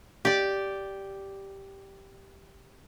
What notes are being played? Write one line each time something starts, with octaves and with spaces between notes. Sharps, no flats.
G4 D5